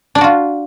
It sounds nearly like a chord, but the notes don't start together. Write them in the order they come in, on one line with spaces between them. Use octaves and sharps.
D4 D5 F#4 F4